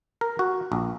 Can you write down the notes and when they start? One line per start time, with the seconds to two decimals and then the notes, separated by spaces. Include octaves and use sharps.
0.21 A#4
0.39 F#4
0.72 A#1